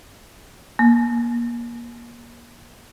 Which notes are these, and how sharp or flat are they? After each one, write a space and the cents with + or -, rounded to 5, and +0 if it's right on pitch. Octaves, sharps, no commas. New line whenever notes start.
A#3 +25